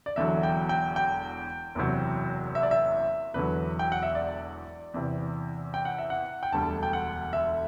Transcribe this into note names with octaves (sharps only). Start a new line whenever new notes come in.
D5
E1 E2 D3 F#3 E5
G5
G5
G5
F#1 E2 C3 F#3
E5
D5
E5
E1 E2 D3 F#3 B4
G5
F#5
E5
D5
E2 C3 E3
G5
F#5
E5
F#5
G5
E1 D2 D3 G3 A5
G5
F#5
E5